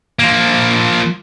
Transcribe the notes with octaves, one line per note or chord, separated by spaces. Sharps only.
F3 A#3